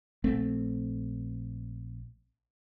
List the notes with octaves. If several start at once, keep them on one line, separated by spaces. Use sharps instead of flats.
A#1 A3 C4